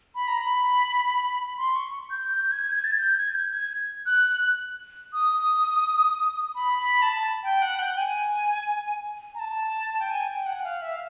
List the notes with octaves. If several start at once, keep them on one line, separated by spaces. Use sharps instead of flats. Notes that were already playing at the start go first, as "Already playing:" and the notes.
B5
A#5
B5
C6
C#6
G6
G6
G#6
G#6
A6
G#6
G6
G#6
G6
G#6
F#6
D#6
B5
B5
A5
G5
F#5
G5
G#5
A#5
A5
G5
G#5
G5
F#5
F5
E5
F5